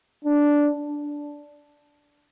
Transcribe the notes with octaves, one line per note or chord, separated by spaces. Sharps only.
D4